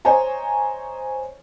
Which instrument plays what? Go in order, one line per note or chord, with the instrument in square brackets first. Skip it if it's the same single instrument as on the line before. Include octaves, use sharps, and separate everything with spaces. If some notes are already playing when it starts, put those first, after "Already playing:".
[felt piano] C5 C#5 D#5 G#5 A#5